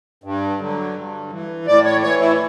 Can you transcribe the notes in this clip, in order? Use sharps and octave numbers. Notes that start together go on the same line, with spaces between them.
G2
D3 F#3
G2
E3
A2 D5
C#5
E3 C#5
E4